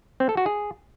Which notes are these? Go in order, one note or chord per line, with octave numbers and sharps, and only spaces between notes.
C4
A4
F#4
G#4